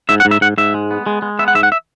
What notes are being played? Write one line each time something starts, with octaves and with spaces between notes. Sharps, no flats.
G#2 E5
F#5
G#2
E5
G#2 F#5
G#2 E5
G#3
B3
G#3
G#3
B3 E5
F#5
G#2 E5
F#5
E5